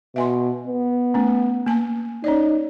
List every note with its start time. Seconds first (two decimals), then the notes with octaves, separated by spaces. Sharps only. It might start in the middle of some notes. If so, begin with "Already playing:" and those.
0.16 B2 E5 G#5 C6
0.67 B3
1.14 A3 C#4
1.66 A#3 G#5 A5
2.24 C#4 D#4 C#5 D5